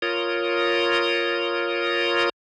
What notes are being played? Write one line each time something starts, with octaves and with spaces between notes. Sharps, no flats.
F4 A#4 C#5 D#6